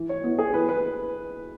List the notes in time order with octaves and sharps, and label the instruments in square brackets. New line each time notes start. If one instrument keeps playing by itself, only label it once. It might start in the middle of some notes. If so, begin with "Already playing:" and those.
Already playing: [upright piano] E3
C#5
B3 E4
G#4
E3 B4
B4